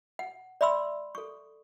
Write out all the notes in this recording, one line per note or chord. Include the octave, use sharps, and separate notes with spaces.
F#5
D5 E5 B5 C6 E6
A4 C#6